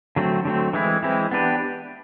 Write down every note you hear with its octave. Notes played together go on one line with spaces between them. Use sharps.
D3 F#3 A3 C4
D3 F#3 A3 C4
E3 G#3 C4 E4
E3 G#3 C4 E4
B3 D4 G4 B4